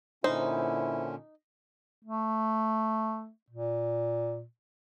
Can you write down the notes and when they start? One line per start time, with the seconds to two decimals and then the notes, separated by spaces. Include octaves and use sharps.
0.24 A#2 D3 C#4 D#4 E4 C5
2.05 A3
3.50 A#2